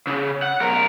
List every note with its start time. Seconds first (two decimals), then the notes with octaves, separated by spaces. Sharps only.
0.07 C#3
0.42 F#5
0.61 B1 A#4